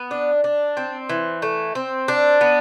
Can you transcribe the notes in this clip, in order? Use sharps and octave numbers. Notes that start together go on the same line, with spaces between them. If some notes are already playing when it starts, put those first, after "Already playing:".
Already playing: B3
D4
D4
C4
E3
A3
C4
D4
B3